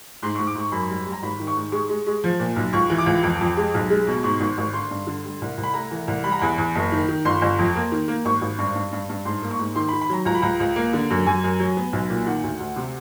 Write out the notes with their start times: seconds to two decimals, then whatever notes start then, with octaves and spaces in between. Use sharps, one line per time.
0.23 G#2 C6
0.35 C#6
0.39 G#2
0.47 D6
0.55 G#2 C#6
0.72 F#2 B5
0.90 G3
1.06 G3
1.12 A#5
1.22 G#1 B5
1.39 D#3
1.47 C#6
1.57 G#2
1.72 G#3 C#6
1.89 G#3
2.07 G#3
2.24 F3
2.40 A#2
2.56 B1
2.73 C#2 C#6
2.90 E3
2.98 D6
3.06 C#2
3.23 F2
3.41 F2
3.57 G#3
3.74 B1
3.90 G#3
4.07 B2
4.23 G#2 C#6
4.40 G#1
4.58 G#1
4.74 D3 C6
4.91 G2
5.07 D3
5.24 G3
5.42 C2
5.58 C2
5.63 B5
5.74 A3 A#5
5.91 E3
6.08 C2
6.24 G3 B5
6.32 A#5
6.39 E2 B5
6.58 E2
6.75 F#1
6.92 D#3
7.08 D#3
7.25 G1 C6
7.41 G1
7.59 F2
7.75 A#3
7.92 D#3
8.08 A#3
8.25 G#1 C#6
8.41 G#1
8.58 G2
8.76 G2
8.93 G2
9.10 G2
9.25 G#2 C6
9.42 A#3
9.51 C#6
9.59 G#2
9.76 D#3 C6
9.89 B5
9.93 D#3
10.01 B5
10.09 F#3 A#5
10.25 C#2 A#5
10.35 B5
10.42 C#2 A#5
10.60 C#2
10.76 A#3
10.93 D3
11.10 F#2
11.26 F#2 G#5
11.44 F#2
11.60 F#3
11.77 B3
11.93 B1
12.10 A#2
12.26 D#3 F#5
12.43 D2
12.60 D2
12.76 C3